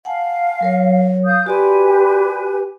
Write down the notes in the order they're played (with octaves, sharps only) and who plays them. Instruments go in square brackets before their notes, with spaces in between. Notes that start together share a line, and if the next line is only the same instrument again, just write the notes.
[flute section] F5 [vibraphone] F#5 G#5 A5
[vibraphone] F#3 A#4 C#5
[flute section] F5 D#6 G6
[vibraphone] F#4 D5 C6 [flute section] G4 B4 G#5